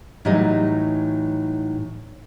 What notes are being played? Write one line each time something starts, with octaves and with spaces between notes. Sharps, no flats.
A2 E3 F#3 G3 D#4 D#5